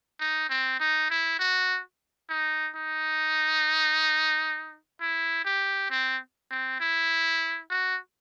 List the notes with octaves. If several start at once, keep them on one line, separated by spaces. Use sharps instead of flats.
D#4
C4
D#4
E4
F#4
D#4
D#4
E4
G4
C4
C4
E4
F#4